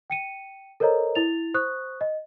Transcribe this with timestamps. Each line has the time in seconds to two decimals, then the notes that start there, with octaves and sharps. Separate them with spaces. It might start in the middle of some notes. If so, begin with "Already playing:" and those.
0.10 G5 C#7 D#7
0.80 A4 A#4 C5 C#5 D#5 A#5
1.15 E4 A6 F7
1.54 C5 C#6 D#6 F#6
2.01 D#5